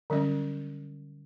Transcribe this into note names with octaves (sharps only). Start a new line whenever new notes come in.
D3 F#3 G3 C#4